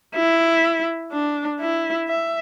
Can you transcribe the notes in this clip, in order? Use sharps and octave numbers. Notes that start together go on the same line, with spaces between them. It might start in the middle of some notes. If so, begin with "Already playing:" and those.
E4
D4
E4
E5